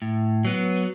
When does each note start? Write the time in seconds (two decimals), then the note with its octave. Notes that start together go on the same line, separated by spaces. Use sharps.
0.02 A2
0.45 F#3 B3